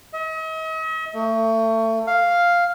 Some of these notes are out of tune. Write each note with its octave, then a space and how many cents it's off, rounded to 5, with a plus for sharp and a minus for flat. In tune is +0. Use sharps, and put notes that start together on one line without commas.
D#5 +45
A3 +30
F5 +0